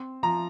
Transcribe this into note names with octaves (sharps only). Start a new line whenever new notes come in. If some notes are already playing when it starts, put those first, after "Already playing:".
Already playing: C4
F3 A#5